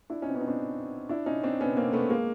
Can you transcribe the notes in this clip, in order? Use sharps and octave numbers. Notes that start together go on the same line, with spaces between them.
D4 E4
C#4 D#4
C4
B3 C#4
D#4
C4 D4
D4 E4
C#4 D#4
C4 D4
B3 C#4
A#3 C4
A3 B3
G#3 A#3